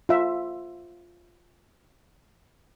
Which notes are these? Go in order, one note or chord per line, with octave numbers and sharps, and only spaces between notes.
F4 E5